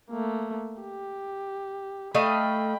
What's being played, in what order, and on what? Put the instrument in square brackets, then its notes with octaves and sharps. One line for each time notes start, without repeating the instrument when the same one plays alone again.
[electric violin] A3 A#3
G4
[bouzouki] A3 D#5 F5 [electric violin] G5 B5